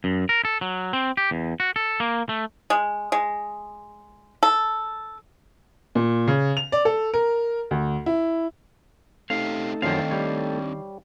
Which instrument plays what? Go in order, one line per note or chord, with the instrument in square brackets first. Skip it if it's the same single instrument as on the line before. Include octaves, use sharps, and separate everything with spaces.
[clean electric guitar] F#2
A#4
A4
F#3
C4
G4
E2
F#4
A4
A#3
A3
[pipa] G#3
G#3
A4
[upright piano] A#2
C#3
F7
D5
A4
A#4
D2
E4
[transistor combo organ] A3 D#4 A4 [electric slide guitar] C4 C#4 G4 [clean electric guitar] F5
[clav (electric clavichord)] F#2 F3 [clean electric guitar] D#3 F5 [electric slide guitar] C4 D4
[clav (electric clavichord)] G3 C#5